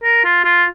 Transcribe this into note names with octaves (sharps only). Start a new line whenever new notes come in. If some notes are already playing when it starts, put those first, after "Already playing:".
A#4
F4
F4